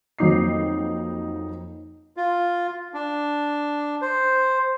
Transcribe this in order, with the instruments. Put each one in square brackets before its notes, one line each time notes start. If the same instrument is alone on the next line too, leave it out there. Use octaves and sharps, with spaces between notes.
[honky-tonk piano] F2 F#3 A#3 D#4 D6 C7
[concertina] F4
D4
C5